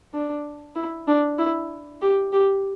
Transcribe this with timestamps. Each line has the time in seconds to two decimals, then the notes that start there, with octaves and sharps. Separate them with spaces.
0.14 D4
0.76 E4
1.08 D4
1.39 E4
2.02 G4
2.33 G4